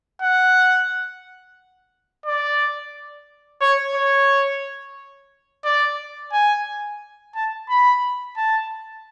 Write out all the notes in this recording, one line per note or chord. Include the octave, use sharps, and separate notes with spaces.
F#5
D5
C#5
C#5
D5
G#5
A5
B5
A5